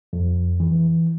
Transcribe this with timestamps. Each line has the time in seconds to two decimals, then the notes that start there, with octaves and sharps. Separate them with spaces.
0.13 F2
0.60 E3